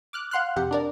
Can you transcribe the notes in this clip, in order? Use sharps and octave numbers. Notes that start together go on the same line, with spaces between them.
D6 F6 F#6
F5 F#5 C6 F6 F#6
F2 C3 G4 F#5
D4 A#4 D5